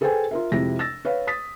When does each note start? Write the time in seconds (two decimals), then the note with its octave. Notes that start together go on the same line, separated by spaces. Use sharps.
0.01 G#4 A4 B4 C5 G5 G#5
0.31 F4 A#4 E5
0.52 F2 C3 G#3 E4 A#6
0.79 E6 A6 A#6
1.05 B4 C#5 F5
1.27 D#6 A6 B6